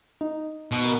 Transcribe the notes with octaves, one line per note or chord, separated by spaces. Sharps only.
D#4
B2
A#4